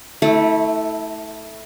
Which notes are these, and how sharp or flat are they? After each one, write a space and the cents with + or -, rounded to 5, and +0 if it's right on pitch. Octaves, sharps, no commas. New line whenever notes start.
A3 +0 E4 -30